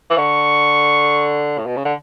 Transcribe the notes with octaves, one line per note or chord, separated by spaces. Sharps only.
E3
D3 C#6
A2
B2
C#3
D3